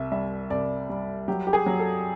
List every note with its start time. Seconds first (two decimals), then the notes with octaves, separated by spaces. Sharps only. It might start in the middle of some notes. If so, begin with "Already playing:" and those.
Already playing: C2 E5
0.12 G3 E5
0.50 C2 D5
0.89 G3
1.28 F#3 G4
1.47 G4
1.53 G#4
1.66 F#3
1.79 A4